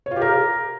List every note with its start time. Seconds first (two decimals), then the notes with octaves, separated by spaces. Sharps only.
0.06 C#5
0.11 F4
0.16 G4
0.21 A#4